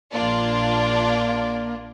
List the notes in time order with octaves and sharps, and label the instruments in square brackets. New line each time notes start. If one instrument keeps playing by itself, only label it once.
[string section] A#1 D4 F4 [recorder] A#3 [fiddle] D5